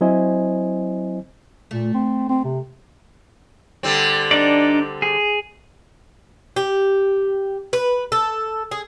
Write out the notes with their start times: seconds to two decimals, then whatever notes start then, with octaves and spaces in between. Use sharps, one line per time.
0.01 F#3 C4 E4 C5 D#5 G#5
1.71 A#2 A3
1.94 C4
2.29 C4
2.44 C3
3.83 D3 G3 C4
4.31 D4 D#4 D5
5.02 G#4
6.56 G4
7.73 B4
8.12 A4
8.71 G#4